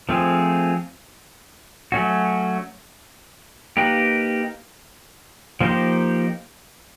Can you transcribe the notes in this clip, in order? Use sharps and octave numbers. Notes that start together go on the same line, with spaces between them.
F3 A3 C4 F4 G#4
F#3 A3 C#4 F#4
A#3 D#4 G4 B4
F3 A#3 D#4 G4 C5